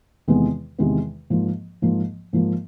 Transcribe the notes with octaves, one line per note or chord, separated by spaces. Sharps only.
E2 C3 D#3 G#3 B3
E2 C3 D#3 G#3 B3
G#2 F3 A#3
G#2 F3 A#3
G#2 F3 A#3